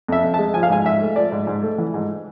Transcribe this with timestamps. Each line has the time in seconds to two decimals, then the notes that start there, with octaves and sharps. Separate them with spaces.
0.08 F2 E5
0.24 F2
0.34 G#3 A5
0.54 F3 G#5
0.63 F5
0.70 G#2 G#5
0.85 G#2 E5
1.01 A3
1.16 F3 D5
1.32 G#2
1.47 G#2
1.63 A3
1.78 E3
1.94 G#2